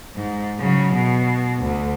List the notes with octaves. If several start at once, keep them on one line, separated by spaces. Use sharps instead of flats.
G#2
C#3 F#3
B2
D2